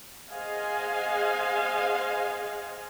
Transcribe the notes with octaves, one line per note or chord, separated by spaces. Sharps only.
G#4 C5 D#5 F5 F#5 G#5